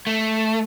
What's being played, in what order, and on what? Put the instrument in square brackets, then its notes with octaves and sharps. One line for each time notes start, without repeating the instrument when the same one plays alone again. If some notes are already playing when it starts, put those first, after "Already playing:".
[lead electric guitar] A3